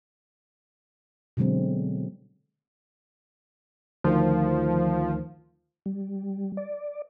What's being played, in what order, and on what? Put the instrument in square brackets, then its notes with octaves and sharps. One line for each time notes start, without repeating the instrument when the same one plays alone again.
[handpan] B2 D3 F#3 G#3 C4
[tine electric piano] D2 D#3 [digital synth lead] F3
[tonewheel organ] G3
D5